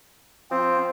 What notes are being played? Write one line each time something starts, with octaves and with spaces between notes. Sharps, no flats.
F3 C4